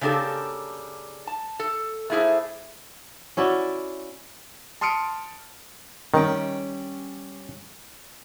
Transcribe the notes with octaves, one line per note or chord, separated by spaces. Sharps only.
C#3 A#3 D4 G4 A4
A5
A4
A3 A#3 E4 G#4 C5
C#4 E4 F#4 D5
A5 C6 D#6 F6 C#7 D7
D#3 G3 C#4 G5